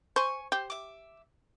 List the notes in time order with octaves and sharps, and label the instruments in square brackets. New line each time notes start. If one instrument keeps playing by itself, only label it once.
[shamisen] C5 [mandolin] G#5 C#6
[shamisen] G4 [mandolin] C5
[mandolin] E5 D6